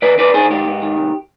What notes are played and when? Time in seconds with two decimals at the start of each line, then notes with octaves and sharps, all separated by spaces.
0.02 D#3 B4 D5
0.18 D4 B4 D5
0.34 D#3 G#4 C5
0.50 G#2 G4
0.65 G#2
0.82 D#3
0.98 C2